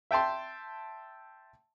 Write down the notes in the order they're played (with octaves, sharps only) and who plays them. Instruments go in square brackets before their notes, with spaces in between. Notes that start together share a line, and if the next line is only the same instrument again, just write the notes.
[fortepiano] E5 G5 A5 C6